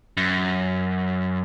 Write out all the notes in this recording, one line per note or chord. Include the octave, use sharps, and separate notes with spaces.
F#2